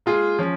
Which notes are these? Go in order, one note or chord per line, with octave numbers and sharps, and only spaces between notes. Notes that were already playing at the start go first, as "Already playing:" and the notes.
G#3 F4 G#4
F3 C#4